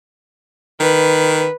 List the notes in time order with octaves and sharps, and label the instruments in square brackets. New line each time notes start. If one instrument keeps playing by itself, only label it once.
[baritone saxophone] D#3 [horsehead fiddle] B4